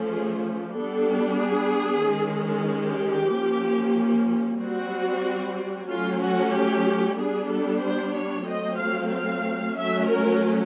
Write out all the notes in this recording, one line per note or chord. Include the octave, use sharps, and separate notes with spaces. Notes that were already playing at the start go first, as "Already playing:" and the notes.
Already playing: F3 A3 C#4
G#4
G3 B3 D4 A4
G#4
D#3 G#3 C#4
G4
F3 A#3 C#4
G3 C4 F#4
F#3 A3 C#4 F4
F#4
G4
G3 B3 D4 G#4
A4
C5
C#5
F#3 A3 C4 D#5
F5
F5
F#3 A3 C#4 E5
A#4